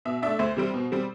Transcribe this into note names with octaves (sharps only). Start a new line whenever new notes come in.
B2 E5
A3 D4 E5
D2 C5
C3 G3 C4
B2
G3 C4